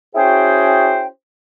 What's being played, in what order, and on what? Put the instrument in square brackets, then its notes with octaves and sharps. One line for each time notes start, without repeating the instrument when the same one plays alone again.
[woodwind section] C#4 E4 F#4 G#4 C5 G5